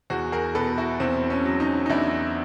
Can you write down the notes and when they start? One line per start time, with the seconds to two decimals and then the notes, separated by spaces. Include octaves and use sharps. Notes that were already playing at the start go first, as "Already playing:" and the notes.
0.10 E2 F#4 G#4
0.32 G#4 A#4
0.55 B2 A4 B4
0.78 E4 F#4
1.00 E2 C4
1.30 C#4
1.45 F#3
1.60 C#4 D#4
1.86 D#4
1.90 E2 D4 E4